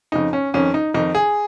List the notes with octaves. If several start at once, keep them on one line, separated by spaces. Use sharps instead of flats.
F2 C#3 D#4
C#4
F2 D#3 C#4
D#4
F2 D#3 D#4
G#4